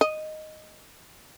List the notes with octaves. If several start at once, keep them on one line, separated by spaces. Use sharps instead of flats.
D#5